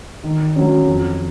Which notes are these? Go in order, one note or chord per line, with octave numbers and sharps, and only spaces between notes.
D#3
F#3 C#4
F2